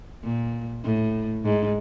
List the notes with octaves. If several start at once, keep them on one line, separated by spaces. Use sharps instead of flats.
A#2
A2
G#2